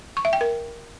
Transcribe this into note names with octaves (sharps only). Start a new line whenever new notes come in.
C#6
E5
G5
A#4